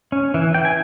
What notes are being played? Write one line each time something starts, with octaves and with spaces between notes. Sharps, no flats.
C#4
E3
E3 G5
G#5